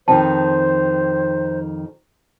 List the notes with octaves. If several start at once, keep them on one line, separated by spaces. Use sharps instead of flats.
F2 D#3 C5 G5 A5